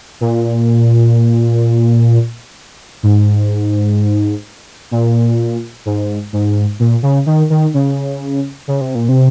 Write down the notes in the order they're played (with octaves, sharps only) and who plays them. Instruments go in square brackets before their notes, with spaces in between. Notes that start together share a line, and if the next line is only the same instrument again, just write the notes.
[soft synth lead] A#2
G#2
A#2
G#2
G#2
A#2
C#3
D#3
D#3
C#3
C#3
C3
A#2
C3